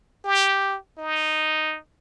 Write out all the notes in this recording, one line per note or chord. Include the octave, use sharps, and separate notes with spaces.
G4
D#4